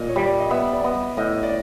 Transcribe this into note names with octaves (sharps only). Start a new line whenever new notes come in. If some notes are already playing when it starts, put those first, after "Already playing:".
Already playing: A#2 D#5
C#5
G3 D5
D#5
B3 E5
D5
B3 D#5
A2 D#5
D5